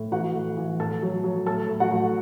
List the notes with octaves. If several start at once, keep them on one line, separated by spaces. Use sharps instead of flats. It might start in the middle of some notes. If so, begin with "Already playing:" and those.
Already playing: A2
E3 F#4 F#5
A2
E3
A2 A4 A5
F#3
F#3
A2 A4 A5
A2
F#4 F#5
A2